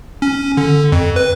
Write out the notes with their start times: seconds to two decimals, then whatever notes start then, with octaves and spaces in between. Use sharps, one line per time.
0.22 C#4
0.57 D3
0.92 F2
1.16 B4